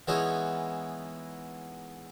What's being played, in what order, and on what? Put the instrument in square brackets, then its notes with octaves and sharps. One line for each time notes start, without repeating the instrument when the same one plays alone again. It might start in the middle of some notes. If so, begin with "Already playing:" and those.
[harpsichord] E3 G#3 B3 C#4 D#4 E4